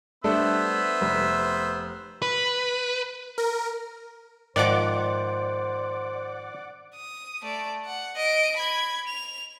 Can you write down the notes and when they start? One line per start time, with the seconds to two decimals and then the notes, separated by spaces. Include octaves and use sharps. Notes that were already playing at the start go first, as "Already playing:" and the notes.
0.24 G3 A3 B3 D4 C5 E5
1.01 F1
2.22 B4
3.38 A#4
4.56 G#2 D#3 F3 C5 D5 F#5 D6
6.96 D#6
7.42 A3 D5
7.85 F#5
8.16 D#5 D7
8.57 B5 G#6
9.07 F7